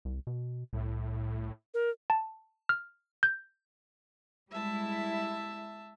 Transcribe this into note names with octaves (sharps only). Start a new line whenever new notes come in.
C2
B2
C2 A2
A#4
A5
F6
G6
G3 G#3 E4 E5 A5